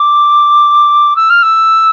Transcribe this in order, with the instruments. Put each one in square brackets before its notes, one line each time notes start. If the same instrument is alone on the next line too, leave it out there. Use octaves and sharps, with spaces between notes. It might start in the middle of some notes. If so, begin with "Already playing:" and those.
Already playing: [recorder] D6
E6
F6
E6